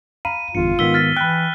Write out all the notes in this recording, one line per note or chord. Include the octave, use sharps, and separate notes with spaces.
F5 A#5 B5 D#7
G1 E2 G2 F4 C#7
G#2 D#3 B3 E6 B6 G7
F6 A6 B6
E3 G5 B5 F#6